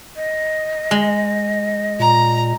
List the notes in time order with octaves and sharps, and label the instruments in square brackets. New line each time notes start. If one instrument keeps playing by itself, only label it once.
[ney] D#5
[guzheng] G#3
[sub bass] A#2 [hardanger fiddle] A#5